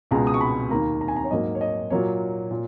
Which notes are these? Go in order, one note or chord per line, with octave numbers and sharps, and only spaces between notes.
C#2 B2 G#3 A#5
D#6
C#6
B5
D#2 D#3 A#3 A#5
A#5
G#5
A#5
C#5
G#2 F#3 A#3 D#5
C#5
D#5
A#2 F#3 A#3 C#5
A#2